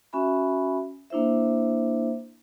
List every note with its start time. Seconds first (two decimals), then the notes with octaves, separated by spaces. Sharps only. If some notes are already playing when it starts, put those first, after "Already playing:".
0.13 C#4 F#4 E5 G#5 B5
1.10 A#3 D4 E4 C5 E5